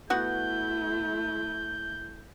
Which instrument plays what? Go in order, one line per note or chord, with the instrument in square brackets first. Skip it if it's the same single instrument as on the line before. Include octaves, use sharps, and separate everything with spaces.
[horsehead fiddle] A3 E4 [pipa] B3 F#4 F#5 [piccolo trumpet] G6